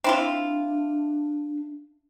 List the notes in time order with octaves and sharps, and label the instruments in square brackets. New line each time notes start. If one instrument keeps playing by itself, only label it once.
[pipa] C4 E4 F4 [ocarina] D4